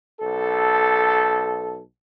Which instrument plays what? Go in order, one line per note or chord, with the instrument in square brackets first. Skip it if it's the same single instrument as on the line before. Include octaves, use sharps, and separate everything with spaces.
[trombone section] B1 A4